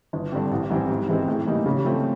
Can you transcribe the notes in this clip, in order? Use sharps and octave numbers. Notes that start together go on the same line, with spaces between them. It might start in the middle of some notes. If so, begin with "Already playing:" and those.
G1
G2 D3 G3 C4
A1
G#2 E3 G3 C4
G#2
E3 G#3 C4
A2
E3 G3 A#3 D#4
C#3
F3 A3 C4